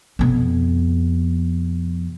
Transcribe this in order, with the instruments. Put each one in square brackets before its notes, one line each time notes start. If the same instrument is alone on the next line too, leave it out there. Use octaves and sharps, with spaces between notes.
[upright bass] F2 B2